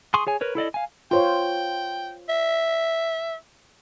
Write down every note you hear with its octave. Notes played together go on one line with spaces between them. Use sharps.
G#4 C6 C#6 D#6
G#4 C#5 G#5
A#4 B4 C#5
E4 A4 D5 D#5
F5 G#5
F4 C5 C#5 G5
E5